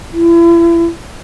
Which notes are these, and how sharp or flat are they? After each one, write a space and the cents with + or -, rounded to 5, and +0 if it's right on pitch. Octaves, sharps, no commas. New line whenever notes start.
E4 +40